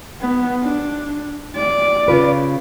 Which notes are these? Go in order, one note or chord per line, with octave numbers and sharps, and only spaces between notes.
B3
D4
D5
C#3 F4 B4